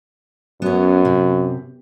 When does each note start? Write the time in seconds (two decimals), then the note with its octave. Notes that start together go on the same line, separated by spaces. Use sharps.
0.62 F#2 B3 C#4
1.05 C3